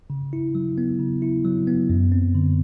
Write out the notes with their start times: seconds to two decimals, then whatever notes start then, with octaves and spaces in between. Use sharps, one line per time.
0.10 C#3
0.33 E4
0.55 F#3
0.78 B3
1.00 C#3
1.22 E4
1.45 F#3
1.67 B3
1.90 F#2
2.12 C4
2.35 D3